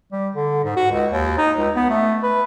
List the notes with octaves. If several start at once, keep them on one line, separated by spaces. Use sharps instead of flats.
G3
D3
G#2
F#4
C#2
D#2
D#4
C#2
B3
A3
B4